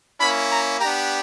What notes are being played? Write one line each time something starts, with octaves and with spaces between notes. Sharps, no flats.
A#3 C#4 E4 B5
A#5
B3 D4 G4 A#5